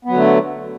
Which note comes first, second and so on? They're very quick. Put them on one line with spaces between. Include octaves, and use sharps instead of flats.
B3 F#3 D3 A3